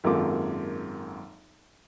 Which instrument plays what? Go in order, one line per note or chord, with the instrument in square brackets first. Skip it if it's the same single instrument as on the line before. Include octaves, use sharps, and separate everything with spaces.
[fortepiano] G#1 F#2 A#3 F4 A4 D6